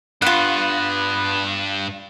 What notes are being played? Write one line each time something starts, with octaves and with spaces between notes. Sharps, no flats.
G2 B3 F4 F#5